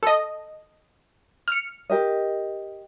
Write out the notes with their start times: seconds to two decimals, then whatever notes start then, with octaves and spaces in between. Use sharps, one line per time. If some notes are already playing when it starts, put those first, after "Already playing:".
0.03 A4 D#5
1.48 F6 C#7
1.90 G4 A#4 D#5